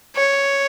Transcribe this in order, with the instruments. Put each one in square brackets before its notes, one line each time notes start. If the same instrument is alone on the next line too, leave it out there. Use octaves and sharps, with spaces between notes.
[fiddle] C#5